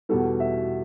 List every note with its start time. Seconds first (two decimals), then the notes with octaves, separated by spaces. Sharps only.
0.09 E2 B2 G3 A4
0.40 E5